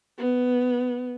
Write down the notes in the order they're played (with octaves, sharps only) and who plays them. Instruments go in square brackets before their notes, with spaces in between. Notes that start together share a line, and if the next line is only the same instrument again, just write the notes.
[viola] B3